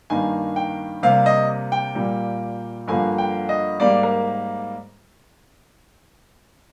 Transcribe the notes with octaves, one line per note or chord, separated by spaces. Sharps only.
G2 D#3 A#3 G#5
G5
C3 G3 A#3 F5
D#5
G5
A#2 G3 A#3
G2 D3 F3 A#3 G#5
G5
D#5
G#2 G3 A#3 D5
A#4